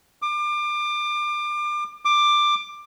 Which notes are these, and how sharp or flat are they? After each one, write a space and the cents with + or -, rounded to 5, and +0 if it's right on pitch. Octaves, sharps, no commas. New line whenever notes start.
D6 +30
D6 +15